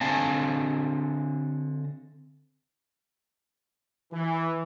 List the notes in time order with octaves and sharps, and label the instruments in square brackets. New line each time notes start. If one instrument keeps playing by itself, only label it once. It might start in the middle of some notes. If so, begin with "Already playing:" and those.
[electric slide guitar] D3 C4 D#5 F5 G#5 A5
[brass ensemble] E3